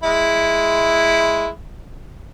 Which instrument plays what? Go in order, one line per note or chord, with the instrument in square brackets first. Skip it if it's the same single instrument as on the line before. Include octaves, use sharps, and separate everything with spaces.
[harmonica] G#3 E4